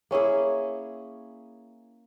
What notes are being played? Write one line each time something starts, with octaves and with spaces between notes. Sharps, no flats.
A#3 C#4 E4 G#4